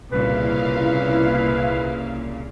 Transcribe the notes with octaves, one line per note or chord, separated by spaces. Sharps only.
C2 A#2 C#3 E4 B4 F5